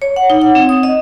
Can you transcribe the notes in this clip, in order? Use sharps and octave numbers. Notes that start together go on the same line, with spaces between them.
C#5
F#5
D#4
F#5
C4
D#6
D#5